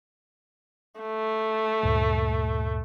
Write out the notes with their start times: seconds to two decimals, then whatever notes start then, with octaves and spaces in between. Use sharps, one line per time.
1.01 A3
1.83 D2 G2 A#2